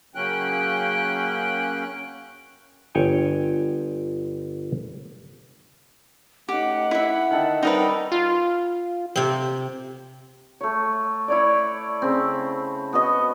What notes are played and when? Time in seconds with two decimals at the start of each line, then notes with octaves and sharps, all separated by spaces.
0.15 C#3 F#3 A#3 C#4 G5 F#6
2.95 G1 C#5 G5 G#5
6.49 A3 C#4 D#4 G4 F#5
6.91 E4 E5
7.31 D3 D#3 A4
7.63 G3 C4 D#4 A#4 B4 D#5
8.12 F4
9.16 C3 C4
10.61 A3 C#5
11.28 E4 C#5 D5
12.02 C#3 C4
12.93 B3 F#4 D#5